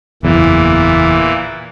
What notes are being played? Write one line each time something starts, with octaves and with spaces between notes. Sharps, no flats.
F#1 E2 A#2 E3